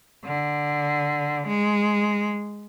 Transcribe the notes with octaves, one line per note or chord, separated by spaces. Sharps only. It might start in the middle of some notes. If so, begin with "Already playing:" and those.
D3
G#3